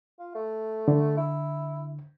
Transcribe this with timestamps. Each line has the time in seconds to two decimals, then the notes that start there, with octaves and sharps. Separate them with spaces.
0.19 F4
0.35 A3
0.88 D3
1.17 E4